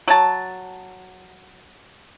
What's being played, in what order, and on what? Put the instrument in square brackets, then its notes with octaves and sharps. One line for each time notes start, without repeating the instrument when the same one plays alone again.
[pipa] F#3 A5